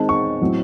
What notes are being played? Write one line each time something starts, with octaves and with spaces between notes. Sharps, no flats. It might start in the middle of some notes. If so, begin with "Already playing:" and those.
Already playing: D#3 G#3 C4 A5
C#6
A2 F#3 C4